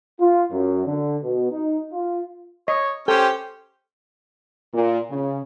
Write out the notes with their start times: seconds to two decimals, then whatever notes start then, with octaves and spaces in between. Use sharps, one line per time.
0.20 F4
0.52 F#2
0.87 D3
1.22 B2
1.51 D#4
1.93 F4
2.68 C#5 D#5
3.08 C#4 G4 A4 C5 G5
4.73 A#2
5.10 C#3